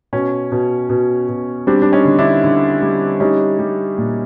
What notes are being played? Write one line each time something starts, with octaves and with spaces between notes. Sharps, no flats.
B2 C#4
B2
B2
B2
G3 C4 D4
D4
C#4 D#4
D3
D4 E4
D3
G3
G3 C#4 D#4
G3
A#2